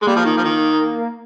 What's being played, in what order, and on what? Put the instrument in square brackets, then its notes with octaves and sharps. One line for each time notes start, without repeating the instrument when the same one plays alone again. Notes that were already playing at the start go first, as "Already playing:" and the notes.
[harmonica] G#3
[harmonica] G3 [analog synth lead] A#3
[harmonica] F3
D#3
F3
D#3